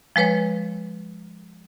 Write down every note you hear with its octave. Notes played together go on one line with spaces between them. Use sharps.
F3 G#3 B4 C#5